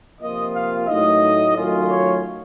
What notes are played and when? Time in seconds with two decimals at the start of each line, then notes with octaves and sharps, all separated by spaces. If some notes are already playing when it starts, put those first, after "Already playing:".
0.21 C3 F3 A#3 F4 D#5
0.54 F5
0.88 A2 F#3 A3 D#4 D#5
1.56 D#3 F#3 A3 C#4 F4
1.89 C#5